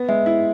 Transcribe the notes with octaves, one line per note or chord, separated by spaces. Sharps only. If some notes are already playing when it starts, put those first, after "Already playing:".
Already playing: B3
G#3 E5
E4